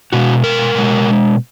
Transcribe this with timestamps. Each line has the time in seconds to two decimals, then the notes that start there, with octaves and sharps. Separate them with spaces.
0.13 B2 G#3 F#4
0.44 A#4
0.75 B2 G#3